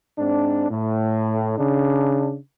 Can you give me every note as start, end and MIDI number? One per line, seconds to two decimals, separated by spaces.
0.18 0.70 44
0.18 0.70 60
0.18 0.70 62
0.70 1.53 45
1.58 2.36 49
1.58 2.36 62